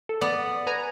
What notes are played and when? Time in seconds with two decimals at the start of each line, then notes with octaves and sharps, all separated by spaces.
0.09 A4
0.21 B3 D5
0.67 B4 G#5 A#5